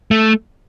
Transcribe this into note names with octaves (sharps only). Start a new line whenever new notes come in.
A3